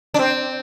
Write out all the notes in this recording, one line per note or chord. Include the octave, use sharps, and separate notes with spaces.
D4
C4